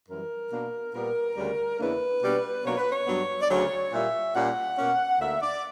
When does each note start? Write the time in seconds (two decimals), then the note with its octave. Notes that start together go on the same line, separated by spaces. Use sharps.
0.08 F#2 E3 G3 A#4
0.51 B2 A#3 D4
0.94 A#2 G3 B3 A#4
1.36 D2 C#3 G3
1.79 E2 C#3 E3 A#3 D4 B4
2.22 B2 G3 A#3 D4
2.64 B2 F#3 A#3 D4 C#5
2.77 B4
2.90 C#5
3.07 G2 F#3 B3
3.41 D5
3.49 D2 C#3 F#3 C#5
3.91 A#2 G3 A#3 E5
4.34 A#2 G3 C#4 F#5
4.78 B2 A#3 C#4
5.19 D2 D3 A#3 E5
5.41 D5